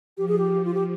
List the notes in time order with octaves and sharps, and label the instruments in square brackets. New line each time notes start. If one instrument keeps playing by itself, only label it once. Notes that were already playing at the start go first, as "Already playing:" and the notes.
[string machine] F3 [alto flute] G4
[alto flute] G#4
G4
F4
G4